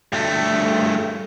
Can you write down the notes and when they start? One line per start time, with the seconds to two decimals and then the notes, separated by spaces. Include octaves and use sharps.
0.13 G2 A3